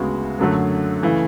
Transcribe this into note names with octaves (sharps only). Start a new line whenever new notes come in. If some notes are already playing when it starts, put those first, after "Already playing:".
Already playing: D2 C#3 G#3 B3 F#4
F#2 D3 F#3 A3
C#3 E3 A3